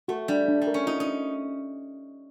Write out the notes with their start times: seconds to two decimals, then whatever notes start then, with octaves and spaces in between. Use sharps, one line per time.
0.08 A3 F#4
0.28 G3 D4
0.48 D4
0.62 G3
0.67 A#4
0.74 C#4
0.87 D#4 F4
1.00 D#4
1.07 D4